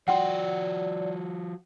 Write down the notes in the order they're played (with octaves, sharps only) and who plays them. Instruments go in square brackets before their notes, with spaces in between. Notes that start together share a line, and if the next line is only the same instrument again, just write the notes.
[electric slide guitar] F3 F#4 [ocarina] D5 [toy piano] F#5 G5 C6